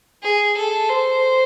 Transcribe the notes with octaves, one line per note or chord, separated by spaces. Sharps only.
G#4
A4
C5